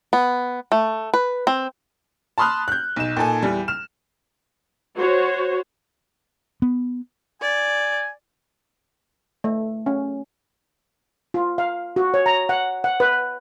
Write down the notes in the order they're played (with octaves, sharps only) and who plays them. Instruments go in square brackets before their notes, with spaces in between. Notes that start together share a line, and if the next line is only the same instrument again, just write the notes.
[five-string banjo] B3
A3
B4
C4
[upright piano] A5 B5 C6 D#6 F6 F#6
F#6 G6
B1 E7
A#2 D#4 A4 G#5
E2 G3
F6 E7
[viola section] F#4 C5 C#5
[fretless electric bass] B3
[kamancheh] D5 [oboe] G#5
[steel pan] A3
C#4
F4
F5
F#4
C#5
A#5
F#5
F#5
B4